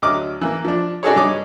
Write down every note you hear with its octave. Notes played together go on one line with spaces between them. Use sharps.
D2 F#3 D#5 D6 F6
E3 A#3
F3 D4
D4 D#4 F#4 G#4 A4 C#5
G2 C#5 D#5 D6